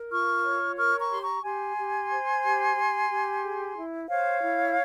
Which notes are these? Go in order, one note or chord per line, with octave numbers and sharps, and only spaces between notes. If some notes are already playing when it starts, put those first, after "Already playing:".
Already playing: A#4
F4 C#6 F6
C#5
A#4 C#6 F6
A#5 C#6
G4 C6
A#5 C#6
G4 G#5 C6
G4
C5
G4
G4
G4
G#4
E4
C5 C#5 F5
E4